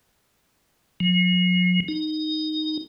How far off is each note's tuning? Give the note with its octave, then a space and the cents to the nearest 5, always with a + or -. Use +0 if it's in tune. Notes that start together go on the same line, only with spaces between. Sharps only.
F#3 -45
D#4 -5